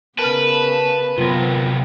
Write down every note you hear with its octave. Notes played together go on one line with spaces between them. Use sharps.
C#3 B3 A#4 B4 A5
C3 F#3 B3 F4 A#4